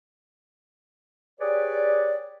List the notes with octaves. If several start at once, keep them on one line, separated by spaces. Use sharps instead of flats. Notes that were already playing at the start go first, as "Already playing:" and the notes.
G4 G#4 B4 C#5 D5